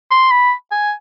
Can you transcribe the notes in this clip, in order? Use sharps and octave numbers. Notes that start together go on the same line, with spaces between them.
C6
B5
G#5